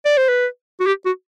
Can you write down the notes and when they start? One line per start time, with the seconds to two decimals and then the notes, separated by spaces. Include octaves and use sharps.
0.05 D5
0.17 C5
0.29 B4
0.80 F#4
0.87 G4
1.05 F#4